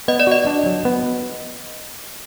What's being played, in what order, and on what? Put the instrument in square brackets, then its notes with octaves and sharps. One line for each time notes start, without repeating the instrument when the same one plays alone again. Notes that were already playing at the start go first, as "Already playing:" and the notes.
[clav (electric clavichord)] B3 [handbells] D#5
[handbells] D5
[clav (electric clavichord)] F#4 [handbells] D#5
[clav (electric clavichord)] D4
F#3
B3